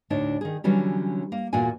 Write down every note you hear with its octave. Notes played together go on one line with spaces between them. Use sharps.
D2 A2 D4 D#4 C#5
D#3 G#4
D3 E3 F#3 G3 C#4
A#3
E2 A#2 A#3 F#4 G#5